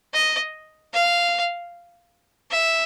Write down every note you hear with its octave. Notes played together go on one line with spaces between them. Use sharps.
D#5
F5
E5